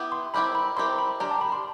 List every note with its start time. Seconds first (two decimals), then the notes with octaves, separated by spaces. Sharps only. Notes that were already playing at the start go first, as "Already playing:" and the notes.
Already playing: B3 E4 G4
0.12 C6
0.34 C4 E4 G4 A#4 B5
0.55 B5
0.77 C4 E4 G4 A#4 C6
0.99 B5
1.20 D4 G4 A#4 A#5
1.31 A5
1.41 B5
1.52 C6